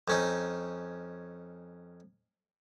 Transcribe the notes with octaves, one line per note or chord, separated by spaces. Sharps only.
F2 C#4 D#4